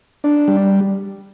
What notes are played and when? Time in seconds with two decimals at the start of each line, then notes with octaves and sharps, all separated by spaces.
0.24 D4
0.48 G3